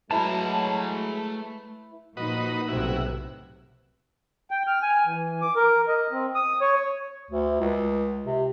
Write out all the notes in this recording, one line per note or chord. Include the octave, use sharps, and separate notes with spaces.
F#3 G#3 A3 E4 B4 A5 A#5
A#2 F3 D#4 F#4 B4 D#5
B1 A2 C3 E4 F#4
G5
F6
G#5
E3
D6
A#4
D#5
C4
D#6
C#5
D2
C#2
C3